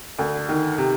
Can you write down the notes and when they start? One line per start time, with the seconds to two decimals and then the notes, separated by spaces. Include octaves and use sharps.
0.19 D2
0.49 D#3
0.78 C3